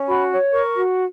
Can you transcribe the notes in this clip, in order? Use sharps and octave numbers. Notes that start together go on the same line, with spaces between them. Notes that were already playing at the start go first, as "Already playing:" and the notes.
Already playing: C#4
F#4 B5
C#5
A#4 C#6
F#4